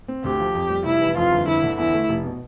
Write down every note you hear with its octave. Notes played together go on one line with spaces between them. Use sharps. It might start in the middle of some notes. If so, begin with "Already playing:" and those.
C4
D2 G4
F3
F2
G3
F1 E4
E3
F2 F4
G1
G1 E4
D3
E2 E4
A3
F1
B2